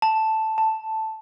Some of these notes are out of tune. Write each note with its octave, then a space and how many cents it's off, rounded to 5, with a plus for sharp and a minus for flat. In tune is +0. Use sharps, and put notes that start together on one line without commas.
A5 +0
A5 +5